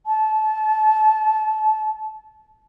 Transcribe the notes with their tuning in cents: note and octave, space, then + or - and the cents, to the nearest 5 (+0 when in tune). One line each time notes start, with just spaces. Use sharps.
A5 -25